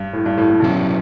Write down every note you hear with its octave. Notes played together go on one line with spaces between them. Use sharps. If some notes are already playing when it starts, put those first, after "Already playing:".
Already playing: G2
A2
G2
A2
A2
G2 B2 F#3 C#4 E4